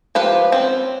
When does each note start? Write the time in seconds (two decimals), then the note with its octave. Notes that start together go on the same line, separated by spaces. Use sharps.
0.15 F3 G4 B4 F5
0.52 C4 C#4